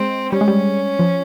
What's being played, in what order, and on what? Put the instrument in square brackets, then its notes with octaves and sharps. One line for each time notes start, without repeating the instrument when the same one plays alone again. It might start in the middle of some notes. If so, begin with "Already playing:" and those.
Already playing: [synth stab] G#3 [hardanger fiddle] C4
[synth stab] G3 [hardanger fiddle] C#4
[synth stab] G#3
G3
F3